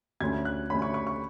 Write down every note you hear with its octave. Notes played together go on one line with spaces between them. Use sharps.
D2 D3 A3 C#4 G#6
F#6
D2 D3 A3 C#4 B5
C#6
C#6
C#6